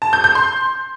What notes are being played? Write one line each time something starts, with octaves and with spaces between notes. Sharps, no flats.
A5
G6
G6
C6